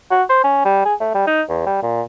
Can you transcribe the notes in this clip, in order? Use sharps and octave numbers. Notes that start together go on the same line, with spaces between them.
F#4
C5
C#4
G3
G#4
A3
G3
D#4
E2
G3
A#2